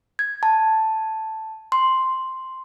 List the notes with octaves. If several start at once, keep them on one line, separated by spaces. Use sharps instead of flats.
G#6
A5
C6